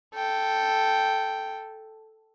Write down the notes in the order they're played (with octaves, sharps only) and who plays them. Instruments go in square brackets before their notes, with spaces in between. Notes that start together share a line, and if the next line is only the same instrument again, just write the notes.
[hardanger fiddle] A4 G5